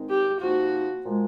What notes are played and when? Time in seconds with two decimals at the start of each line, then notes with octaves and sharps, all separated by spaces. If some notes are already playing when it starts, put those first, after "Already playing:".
Already playing: G#2 D#3 G#3 C4 D#4
0.10 G4
0.41 C3 F3 A#3 D#4 F#4
1.03 A#2 F3 G#3